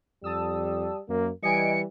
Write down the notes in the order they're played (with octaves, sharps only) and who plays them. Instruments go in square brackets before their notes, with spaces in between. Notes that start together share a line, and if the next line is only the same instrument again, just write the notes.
[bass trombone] F2 [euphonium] G3 [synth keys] A5 D#6 E6
[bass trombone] F#2 [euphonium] A#3
[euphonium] E3 [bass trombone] G3 [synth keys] D#5 G#5 D7 [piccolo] C#7